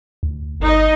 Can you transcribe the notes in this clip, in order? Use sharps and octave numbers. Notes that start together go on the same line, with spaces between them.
D2
G1 D#4 D#5